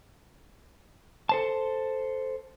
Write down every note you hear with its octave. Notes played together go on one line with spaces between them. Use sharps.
A4 C5 A5